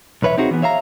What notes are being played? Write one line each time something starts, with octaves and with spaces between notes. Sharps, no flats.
B1 E2 B4 C#5 E5
C4 D#4 F#4 G#4
E3 B3
C#5 E5 F5 A#5